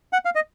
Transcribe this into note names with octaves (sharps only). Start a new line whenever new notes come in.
F#5
F5
D#5